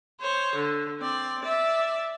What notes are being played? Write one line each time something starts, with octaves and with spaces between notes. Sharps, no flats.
C5 C#5
D3
C4 D5
D5 E5